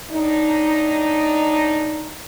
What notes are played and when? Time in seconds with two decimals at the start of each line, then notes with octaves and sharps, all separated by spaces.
0.11 A2 D4 D#4